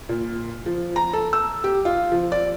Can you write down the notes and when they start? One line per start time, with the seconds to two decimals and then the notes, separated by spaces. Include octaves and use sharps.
0.09 A#2
0.66 F3
0.96 A#5
1.13 A4
1.33 E6
1.64 G4
1.85 F4
2.12 F3
2.32 D5